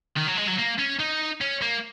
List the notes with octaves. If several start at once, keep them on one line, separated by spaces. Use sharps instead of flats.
D#3
F#3
G#3
F#3
A#3
C#4
D#4
C#4
A#3